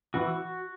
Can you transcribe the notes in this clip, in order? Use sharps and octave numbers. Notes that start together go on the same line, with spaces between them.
E3 F#4